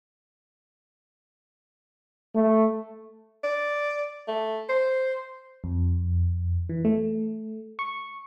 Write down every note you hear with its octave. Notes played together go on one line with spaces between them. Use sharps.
A3
D5
A3
C5
F2
E3
A3
C#6